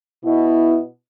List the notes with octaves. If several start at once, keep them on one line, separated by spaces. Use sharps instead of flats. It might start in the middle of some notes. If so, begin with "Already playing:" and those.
B2 E4